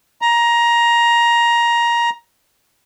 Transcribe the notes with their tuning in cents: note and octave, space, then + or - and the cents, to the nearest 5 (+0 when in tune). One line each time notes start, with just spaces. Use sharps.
A#5 +15